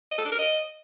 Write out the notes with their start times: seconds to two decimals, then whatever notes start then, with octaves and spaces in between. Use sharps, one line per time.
0.11 D#5
0.18 A4
0.25 D4
0.32 A#4
0.39 D#5